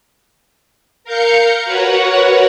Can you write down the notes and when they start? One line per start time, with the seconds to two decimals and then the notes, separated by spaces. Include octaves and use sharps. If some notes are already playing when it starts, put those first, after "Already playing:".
1.04 A#4 F5 G6 C#7
1.65 F#4 A#4 B4 C#5 F#5